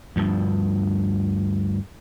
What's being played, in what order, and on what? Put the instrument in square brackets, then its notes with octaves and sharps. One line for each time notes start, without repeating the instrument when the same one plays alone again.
[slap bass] D2 G2 F3